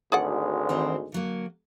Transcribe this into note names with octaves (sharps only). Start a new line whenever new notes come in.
G#1 D2 G#3 G#4 D5 F#5
D#3 E3 C4
D3 F#3 A#3